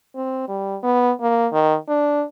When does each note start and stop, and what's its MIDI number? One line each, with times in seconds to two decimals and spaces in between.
0.15 0.44 60
0.48 0.77 55
0.83 1.12 59
1.21 1.47 58
1.53 1.76 51
1.88 2.24 62